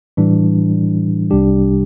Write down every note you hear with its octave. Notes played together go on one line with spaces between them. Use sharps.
A2 E3 G3 D4
C2 C3 G3 D4 G4